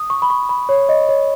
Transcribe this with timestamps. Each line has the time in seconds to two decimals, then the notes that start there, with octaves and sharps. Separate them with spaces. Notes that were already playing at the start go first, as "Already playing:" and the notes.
Already playing: D#6
0.10 C#6
0.22 B5
0.30 C#6
0.49 B5
0.69 C#5
0.89 D#5
1.09 C#5